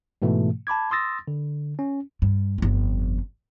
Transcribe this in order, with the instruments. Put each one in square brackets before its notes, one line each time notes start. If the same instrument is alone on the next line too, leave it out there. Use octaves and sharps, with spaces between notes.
[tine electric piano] G#2 B2 E3 A3
A5 B5 D6 G#6
C6 D#6 E6 A6 A#6
D3
C#4
[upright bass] G2
G1 F2